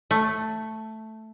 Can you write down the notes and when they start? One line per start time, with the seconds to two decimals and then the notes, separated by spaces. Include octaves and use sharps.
0.11 A3